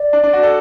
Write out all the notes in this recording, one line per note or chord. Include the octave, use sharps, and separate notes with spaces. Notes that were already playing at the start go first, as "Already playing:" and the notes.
Already playing: D5
D4
D4
F#4
A4